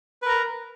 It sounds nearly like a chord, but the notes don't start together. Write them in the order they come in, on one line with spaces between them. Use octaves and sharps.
B4 A#4 A#5